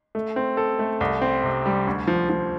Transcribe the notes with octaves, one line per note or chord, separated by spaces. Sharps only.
A3
C4
A4
A3
C2
C4
C3
G3
D2
F3
F3